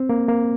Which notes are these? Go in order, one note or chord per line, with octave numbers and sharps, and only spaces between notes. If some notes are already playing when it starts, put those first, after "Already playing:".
Already playing: C4
A#3
A#3